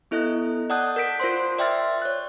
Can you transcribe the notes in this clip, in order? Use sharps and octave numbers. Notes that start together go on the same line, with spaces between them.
B3 E4 A4 D#5 F#6
D5 F#5 A5 D#6 F#6 G6
A#4 G6 B6 D7
F4 A#4 C5 C6
D5 E5 G5 C6 F6 A6
C#5 F#6